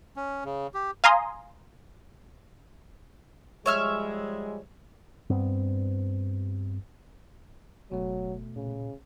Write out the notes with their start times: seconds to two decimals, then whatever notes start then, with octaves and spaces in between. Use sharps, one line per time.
0.16 C#4
0.45 C#3
0.74 G4
1.04 F5 G#5 A#5 C6 D#6
3.66 F3 G3 G#3 C#5 E5 F6
5.30 G2 B3 C4
7.92 F#1 B2 F#3 A3
8.56 A#2 C#3